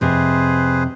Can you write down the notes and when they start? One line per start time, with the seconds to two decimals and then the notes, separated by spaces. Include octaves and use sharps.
0.01 F2 C3 G#4 B4 C5